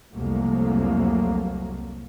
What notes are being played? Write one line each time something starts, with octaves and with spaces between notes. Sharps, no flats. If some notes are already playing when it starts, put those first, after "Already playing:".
C2 F2 F#3 A3 A#3